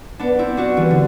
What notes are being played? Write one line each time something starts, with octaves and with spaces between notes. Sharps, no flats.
B3 D4
C4 E4
D4 F#4
E3 G3
D3